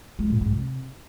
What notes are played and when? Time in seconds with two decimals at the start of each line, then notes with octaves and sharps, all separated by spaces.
0.19 G#3
0.30 A#2
0.41 G#2
0.52 C3